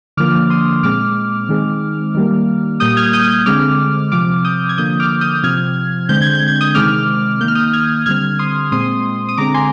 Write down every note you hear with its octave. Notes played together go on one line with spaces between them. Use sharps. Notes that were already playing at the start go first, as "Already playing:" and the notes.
D3 F3 A#3 D6 F6
C6 D#6
A#2 G#3 C4 D6 F6
D#3 G#3 C4
D#3 G3 A#3
A#2 G3 A#3 D#6 G6
F6 G#6
D#6 G6
D#6 G6
D3 G#3 C4 D6 F6
C3 F3 C4 D6 F6
D#6 G6
G#6
D3 F3 A#3 D#6 G6
D6 F6
D#6 G6
C3 F3 C4 F6 G#6
D3 G#3 C4 G6
G#6
G6
G#6
D#6 G6
C3 D#3 G#3 C4 D6 F6
D#3 A#3 F6 G6
D#6 G6
F6 G#6
D3 G3 C4 F6 G#6
C6 D#6
A#2 G#3 C4 C6 D#6
D#6
D3 G#3 C4 A#5 D6
G#5 C6